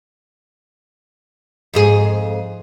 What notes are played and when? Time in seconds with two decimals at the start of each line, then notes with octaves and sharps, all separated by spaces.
1.74 F2 G#2 G#4